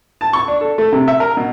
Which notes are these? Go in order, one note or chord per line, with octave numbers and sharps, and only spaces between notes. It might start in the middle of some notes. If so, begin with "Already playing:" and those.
A5
C#6
D4
A4
A3
C3
E5
A#4
B2